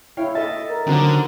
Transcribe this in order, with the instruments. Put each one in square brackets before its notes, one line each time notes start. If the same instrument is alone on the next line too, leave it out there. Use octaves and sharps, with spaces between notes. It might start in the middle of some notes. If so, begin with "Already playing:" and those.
[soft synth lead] E4 [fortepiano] C#5 F5 G5
[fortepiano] A4 D#5 E5 [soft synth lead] A6
[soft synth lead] A#4
[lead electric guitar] D3 [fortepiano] D#3 F#3 C4